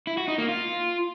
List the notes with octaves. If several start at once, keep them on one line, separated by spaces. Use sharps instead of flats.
E4
F#4
D#4
A#3
F4